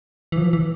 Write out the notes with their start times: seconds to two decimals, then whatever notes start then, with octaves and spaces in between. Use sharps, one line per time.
0.32 E3
0.37 F3
0.53 E3